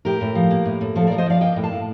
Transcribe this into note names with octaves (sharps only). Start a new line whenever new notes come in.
A2 G4 A#4
A2
F3
A#3
A2
A2
F3 A4 C5
A#4 D5
F3
C5 D#5
F3 D5 F5
A#3 D#5 G5
A2
F5 A5
A2